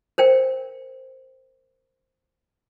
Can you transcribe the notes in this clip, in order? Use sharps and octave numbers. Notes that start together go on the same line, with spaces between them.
A#4 C5 G5